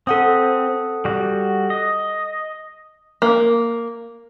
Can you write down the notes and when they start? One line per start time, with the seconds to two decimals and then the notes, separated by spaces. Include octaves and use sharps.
0.07 C4 A4 F#5 D#6
1.05 G3 F#4
1.70 D#5
3.22 A#3